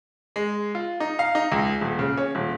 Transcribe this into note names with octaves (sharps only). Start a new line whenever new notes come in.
G#3
F4
D#4
F5
D#4
C#2
D#1
C#3
C#4
D#1